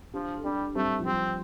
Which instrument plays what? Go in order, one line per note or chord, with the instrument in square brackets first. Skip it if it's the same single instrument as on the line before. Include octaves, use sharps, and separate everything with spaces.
[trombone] F3 [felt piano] D4 G4
[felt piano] A4
[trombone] G3 [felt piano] D4 G4
[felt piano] G3 C4 [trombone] A3
[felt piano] F3
[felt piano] G3 [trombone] C4